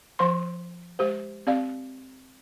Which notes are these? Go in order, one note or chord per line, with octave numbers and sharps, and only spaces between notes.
F3 C5 C6
G#3 G4 C5
C4 G4 D5 F5